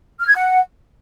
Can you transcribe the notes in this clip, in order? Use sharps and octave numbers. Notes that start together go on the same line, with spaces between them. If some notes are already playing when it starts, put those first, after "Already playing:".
F6
G#6
F#5